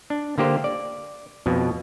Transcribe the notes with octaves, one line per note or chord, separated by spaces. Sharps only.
D4
D3 A#3 G4 C5
D5
F2 B2